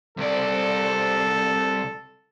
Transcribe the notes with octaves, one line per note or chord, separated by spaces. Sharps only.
C2 A4 D5